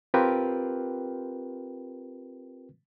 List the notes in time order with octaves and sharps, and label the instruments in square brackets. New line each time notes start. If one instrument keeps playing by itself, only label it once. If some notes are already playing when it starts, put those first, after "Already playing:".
[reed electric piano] C4 F4 G4 A#4 B4 G5